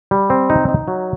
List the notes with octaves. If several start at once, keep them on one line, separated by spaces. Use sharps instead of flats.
G3
C4
D#4
D#4
F#3